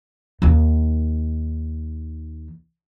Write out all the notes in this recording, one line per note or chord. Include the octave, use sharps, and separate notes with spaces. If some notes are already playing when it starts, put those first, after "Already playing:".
D#2 D#3